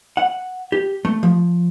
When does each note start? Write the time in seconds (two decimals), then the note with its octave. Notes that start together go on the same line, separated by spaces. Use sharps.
0.17 F#5
0.72 G4
1.05 A3
1.23 F3